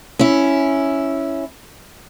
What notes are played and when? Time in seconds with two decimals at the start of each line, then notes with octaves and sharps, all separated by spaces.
0.19 C#4 E4